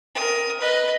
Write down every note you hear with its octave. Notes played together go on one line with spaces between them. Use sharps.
A#4 D#6
B4 D#5